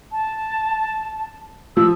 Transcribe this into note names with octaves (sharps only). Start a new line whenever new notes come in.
A5
F3 E6